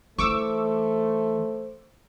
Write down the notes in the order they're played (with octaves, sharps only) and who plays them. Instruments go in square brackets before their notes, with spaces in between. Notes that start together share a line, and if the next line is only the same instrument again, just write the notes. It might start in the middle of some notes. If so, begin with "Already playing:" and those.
[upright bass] E3 [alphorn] A3 [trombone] C5 [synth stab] C#6 D6 E6